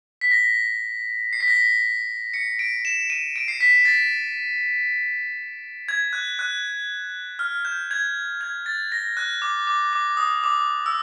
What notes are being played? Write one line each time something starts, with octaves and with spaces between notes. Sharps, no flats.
B6
A#6
C7
B6
A#6
B6
C#7
D7
E7
D#7
D7
C7
B6
A6
G#6
F#6
F#6
F6
G6
G#6
G#6
A6
A#6
F#6
D6
D6
D6
D#6
D6
E6